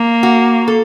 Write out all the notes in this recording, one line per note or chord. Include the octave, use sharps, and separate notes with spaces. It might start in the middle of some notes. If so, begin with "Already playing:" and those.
Already playing: A#3
F#4
A4